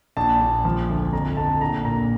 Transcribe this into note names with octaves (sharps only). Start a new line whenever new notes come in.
A#1 A5
A#1
F3
D2
F2 A#5
F2 A5
A#1 A#5
A#2 A#5